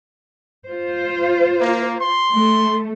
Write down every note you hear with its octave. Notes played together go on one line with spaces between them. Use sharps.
F4 C5
A#3
C6
A3